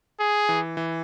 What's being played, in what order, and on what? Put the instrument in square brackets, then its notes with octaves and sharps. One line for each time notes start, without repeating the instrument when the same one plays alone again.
[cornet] G#4
[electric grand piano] E3
E3